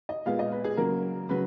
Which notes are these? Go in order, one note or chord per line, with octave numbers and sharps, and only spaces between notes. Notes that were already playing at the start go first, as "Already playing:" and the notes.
D#5
A#2 G#3 B3 F5
D#5
B4
G#4
C#3 F#3 A#3 A#4
C#3 F#3 B4